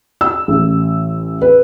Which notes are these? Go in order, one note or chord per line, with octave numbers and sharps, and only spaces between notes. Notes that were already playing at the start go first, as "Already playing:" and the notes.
E6
A1
B4